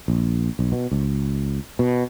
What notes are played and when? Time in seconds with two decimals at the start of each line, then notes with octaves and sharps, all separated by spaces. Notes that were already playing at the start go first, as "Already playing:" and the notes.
0.08 A#1
0.59 B1
0.72 B2
0.91 C#2
1.79 B2